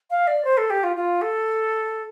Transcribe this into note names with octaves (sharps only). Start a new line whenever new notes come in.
F5
D5
C5
A4
G4
F4
F4
A4